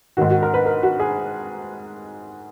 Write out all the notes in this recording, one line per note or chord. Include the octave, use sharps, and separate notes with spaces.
G#2 D#3 F#4
F#4
A#4
B4
A#4
F#4
G#4